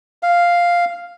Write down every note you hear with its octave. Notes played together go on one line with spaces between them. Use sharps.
F5